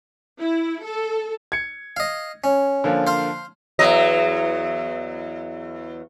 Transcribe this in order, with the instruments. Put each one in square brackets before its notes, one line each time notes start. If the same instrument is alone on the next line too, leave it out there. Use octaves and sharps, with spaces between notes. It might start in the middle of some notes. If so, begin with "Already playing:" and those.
[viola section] E4
A4
[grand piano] G#6 C#7
[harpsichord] D#5 F5
C#4
[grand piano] D3 F3 A#3
[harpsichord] C5 F5
[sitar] E2 F#3 D#5